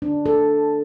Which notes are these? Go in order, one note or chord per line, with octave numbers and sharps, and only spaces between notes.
D4
A4